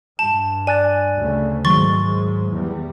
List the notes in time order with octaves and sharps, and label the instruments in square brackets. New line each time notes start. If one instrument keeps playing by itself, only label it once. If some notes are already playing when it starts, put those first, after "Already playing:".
[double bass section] G2 [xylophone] A5
[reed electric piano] D5 F#6 A6 [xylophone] G#5
[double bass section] D2 C#3 A3
[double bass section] G#2 G#3 [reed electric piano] D#3 F#3 [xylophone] C6 C#6 A6
[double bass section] E2 G3